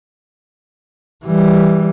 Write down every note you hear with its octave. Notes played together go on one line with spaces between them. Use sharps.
E3 G3